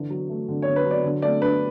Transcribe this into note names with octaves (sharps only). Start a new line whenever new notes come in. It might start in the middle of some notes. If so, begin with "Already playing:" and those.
Already playing: D3 E3
F#3
A3
D3
D3 C#5
B4
F#3
D5
D3
A3 D5
D4 B4